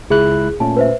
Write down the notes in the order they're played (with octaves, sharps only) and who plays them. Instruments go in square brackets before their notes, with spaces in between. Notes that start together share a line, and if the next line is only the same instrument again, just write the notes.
[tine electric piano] C#2 E4 F#6 [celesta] G#4
[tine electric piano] A#2 A3 C#4 [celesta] A5
[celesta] B4 C5 E5